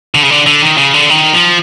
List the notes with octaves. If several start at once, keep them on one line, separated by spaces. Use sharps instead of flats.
D3
C#3
D3
D3
D#3
C#3
D3
D#3
F3